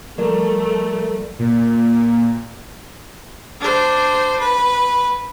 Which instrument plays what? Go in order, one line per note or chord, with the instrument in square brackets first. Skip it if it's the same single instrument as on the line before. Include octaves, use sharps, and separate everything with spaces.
[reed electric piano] F3 G3 [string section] A3 [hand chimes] A#4 D5
[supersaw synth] A#2
[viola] D4 C5
B4